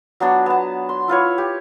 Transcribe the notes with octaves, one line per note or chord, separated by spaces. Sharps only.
F#3 B3 D4 F#4
B3 A5
C6
E4 F4 B4 C#5
G4